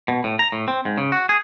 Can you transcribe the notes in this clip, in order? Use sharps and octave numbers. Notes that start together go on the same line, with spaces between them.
B2
A2
A#5
A2
C4
G#2
C#3
F#4
G#4